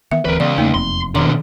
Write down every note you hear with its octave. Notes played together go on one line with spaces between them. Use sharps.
D#3 E3 B3 E5
D#1 D2 E3 C4 A#4 B4
C#2 B3 D5
E2 A3 A#3 D#4
E1 F2 C3 C4 C6
B2 D3 D#3 A#5 C6